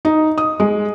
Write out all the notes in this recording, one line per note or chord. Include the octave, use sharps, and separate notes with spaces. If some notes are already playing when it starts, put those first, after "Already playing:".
D#4
D#6
G#3